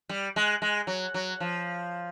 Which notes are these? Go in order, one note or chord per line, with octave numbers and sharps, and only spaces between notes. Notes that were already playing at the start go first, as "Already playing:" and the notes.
G3
G#3
G#3
F#3
F#3
F3